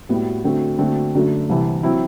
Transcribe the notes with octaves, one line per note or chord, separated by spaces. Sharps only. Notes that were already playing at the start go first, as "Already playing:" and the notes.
A2 G3 B3 F#4
D3 A3 C4 F#4
D3 A3 C4 F#4
F#2 D3 A3
C2 C3 E3
F#3 C4 E4